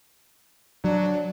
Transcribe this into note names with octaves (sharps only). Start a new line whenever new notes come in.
F#3 D4